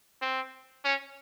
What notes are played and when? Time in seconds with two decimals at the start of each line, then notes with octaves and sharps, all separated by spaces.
0.22 C4
0.85 C#4